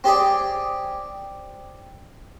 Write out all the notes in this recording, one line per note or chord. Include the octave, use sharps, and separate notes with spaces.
C4 G4 G#4 D5